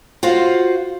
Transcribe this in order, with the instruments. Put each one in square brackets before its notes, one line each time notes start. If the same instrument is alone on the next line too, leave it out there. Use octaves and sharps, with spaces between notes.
[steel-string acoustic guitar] F4 F#4 C5 F5